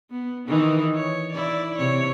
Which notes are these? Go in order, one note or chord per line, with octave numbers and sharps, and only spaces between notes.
B3
D#3 E3 D#4
C#5
E4 D5
C3 C#5